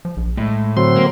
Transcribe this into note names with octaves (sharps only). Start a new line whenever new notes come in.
F3
A#1
A2 G#3
D3 F#3 C4 C6
A#3